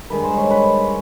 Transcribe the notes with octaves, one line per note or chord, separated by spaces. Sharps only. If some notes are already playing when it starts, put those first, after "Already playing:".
G2 D#3 G#3 B4
C5
C#5
B4